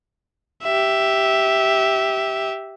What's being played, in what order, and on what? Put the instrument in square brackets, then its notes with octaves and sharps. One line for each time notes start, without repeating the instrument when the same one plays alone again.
[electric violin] G4 E5